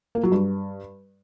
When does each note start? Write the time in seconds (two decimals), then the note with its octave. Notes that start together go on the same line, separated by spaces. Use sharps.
0.15 A#3
0.23 F#3
0.32 G2